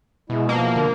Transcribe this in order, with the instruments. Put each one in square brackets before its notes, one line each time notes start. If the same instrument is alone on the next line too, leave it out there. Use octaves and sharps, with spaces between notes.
[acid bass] B2 [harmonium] G#3 E4
[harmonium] F3 [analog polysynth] A#3
[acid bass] D3